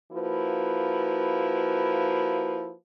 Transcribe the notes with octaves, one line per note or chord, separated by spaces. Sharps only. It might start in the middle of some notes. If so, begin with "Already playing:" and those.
F3 A#3 E4 F#4 B4